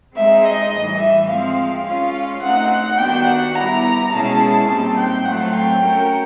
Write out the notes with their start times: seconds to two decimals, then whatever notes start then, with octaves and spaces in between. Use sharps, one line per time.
0.16 G#3 C4 D#4 G#4 E5
0.44 D#5
0.72 A2 E3 G3
1.00 E5
1.29 F3 G#3 C4 F5
1.86 G#3 C#4 F4 F5
2.43 A3 C4 D#4 F#5
2.70 F#5
2.98 D#3 G3 B3 D4 F#4 G5
3.27 F#5
3.55 G3 B3 E4 A#5
4.11 B2 G#3 C#4 E4 G#4 A5
4.68 A#2 G3 C4 D#4 A5
4.97 G5
5.25 A2 F#3 A3 C4 F4 F#5
5.53 G5
5.82 A3 C#4 F#4 A#4